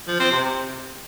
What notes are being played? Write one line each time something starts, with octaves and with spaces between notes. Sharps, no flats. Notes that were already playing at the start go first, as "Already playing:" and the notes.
F3
C4
C3